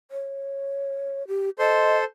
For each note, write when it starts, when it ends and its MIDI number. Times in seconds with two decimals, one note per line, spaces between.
0.11 1.27 73
1.28 1.50 67
1.59 2.04 69
1.59 2.04 72
1.59 1.97 75
1.59 2.04 84